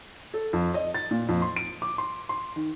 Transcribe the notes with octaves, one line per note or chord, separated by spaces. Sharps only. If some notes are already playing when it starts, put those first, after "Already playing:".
A4
F2
D#5
A6
A#2
F2
C6
D7
D6
C6
C6
D#3